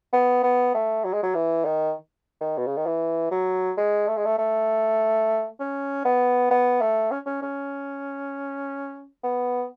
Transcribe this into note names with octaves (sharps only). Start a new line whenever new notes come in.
B3
B3
A3
F#3
G#3
F#3
E3
D#3
D#3
B2
C#3
D#3
E3
F#3
G#3
A3
G#3
A3
A3
C#4
B3
B3
A3
C#4
C#4
C#4
B3